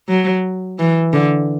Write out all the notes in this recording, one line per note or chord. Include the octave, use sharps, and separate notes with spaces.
F#3
E3
D3